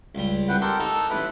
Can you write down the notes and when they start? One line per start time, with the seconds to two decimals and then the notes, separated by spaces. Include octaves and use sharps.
0.15 C#2 G3
0.49 C2 B4 F#5 G5
0.61 C4 G4 A4 A#4
0.80 D#4 A4 E6
1.10 A1 E4 B4